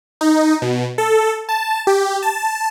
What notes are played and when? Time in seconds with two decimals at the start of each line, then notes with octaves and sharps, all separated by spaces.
0.21 D#4
0.62 B2
0.98 A4
1.49 A5
1.87 G4
2.23 A5